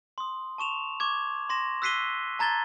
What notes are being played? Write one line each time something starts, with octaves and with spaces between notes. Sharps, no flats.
C6 D#6
A5 C#6 E7 F7
C#6 D6 G#6
C6 A#6 E7
E6 F#6 B6 C7 D#7 G7
A5 A#5 G#6 A6 G7